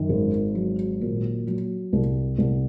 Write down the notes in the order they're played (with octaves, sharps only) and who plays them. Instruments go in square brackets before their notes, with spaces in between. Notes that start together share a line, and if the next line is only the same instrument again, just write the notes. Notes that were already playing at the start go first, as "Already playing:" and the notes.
Already playing: [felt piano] F#2 D#3
G#1
F#3
A#2
F#3
C2
C2